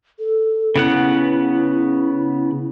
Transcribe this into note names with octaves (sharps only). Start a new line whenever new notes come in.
A4
C#3 B3 E4 F#5